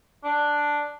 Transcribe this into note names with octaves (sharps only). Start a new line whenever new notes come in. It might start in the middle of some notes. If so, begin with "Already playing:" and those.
D4